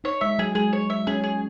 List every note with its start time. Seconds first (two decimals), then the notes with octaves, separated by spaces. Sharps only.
0.04 D#4 C#5
0.21 G#3 E5
0.38 F#3 G#4
0.55 G#3 G#4
0.73 C#5
0.90 E5
1.07 C#4 G#4
1.24 G#4